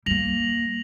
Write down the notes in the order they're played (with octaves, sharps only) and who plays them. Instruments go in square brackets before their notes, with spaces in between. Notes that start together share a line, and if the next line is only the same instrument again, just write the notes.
[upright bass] G3 A#3 [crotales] A#6 F7 F#7